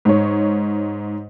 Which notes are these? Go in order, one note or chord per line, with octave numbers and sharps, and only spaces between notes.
G#2 C#5